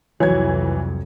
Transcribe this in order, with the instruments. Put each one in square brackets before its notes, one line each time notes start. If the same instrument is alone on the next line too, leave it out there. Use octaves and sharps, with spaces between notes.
[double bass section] C2 F2 [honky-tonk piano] E3 G#6 [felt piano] F#3 C#5